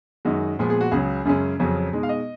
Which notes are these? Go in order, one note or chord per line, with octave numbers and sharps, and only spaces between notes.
F#2 D#3 G#3 D#4 F#4
A#2 F3 G#3 B3
G#4
F#4
C#2 C#3 F#3 G#4
F#2 C#3 G#3 C#4
F2 C#3 F#3 C#4
B2 G#3 D#4
F5
D#5